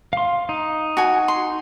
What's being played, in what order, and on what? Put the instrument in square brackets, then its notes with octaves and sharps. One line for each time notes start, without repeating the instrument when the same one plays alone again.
[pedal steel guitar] F5 C6
D#4
[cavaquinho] F#4 G#5
C6